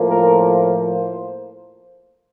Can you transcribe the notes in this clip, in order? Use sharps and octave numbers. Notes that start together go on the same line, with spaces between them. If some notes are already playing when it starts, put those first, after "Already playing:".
Already playing: A2 F3 A#3
A#4
C5